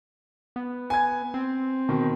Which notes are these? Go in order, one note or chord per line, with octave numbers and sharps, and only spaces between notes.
B3
G#5 G#6
C4
B2 D#3